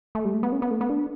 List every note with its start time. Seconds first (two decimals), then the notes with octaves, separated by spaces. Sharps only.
0.15 A3
0.25 G3
0.34 A3
0.43 B3
0.52 C#4
0.62 B3
0.71 A3
0.81 B3
0.90 D4